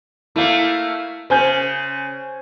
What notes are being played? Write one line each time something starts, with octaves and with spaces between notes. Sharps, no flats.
A3 A#3 E4 F5
C#3 C5 G#5 G6